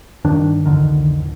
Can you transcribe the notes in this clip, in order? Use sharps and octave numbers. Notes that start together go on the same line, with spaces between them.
G2 D#3 D4
C2 F2 D3 D#3
D1